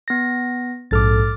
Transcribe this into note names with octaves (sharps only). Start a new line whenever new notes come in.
B3 A#6
A#1 G#2 A4 D6 F6 A6